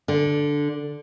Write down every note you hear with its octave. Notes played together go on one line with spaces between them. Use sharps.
D3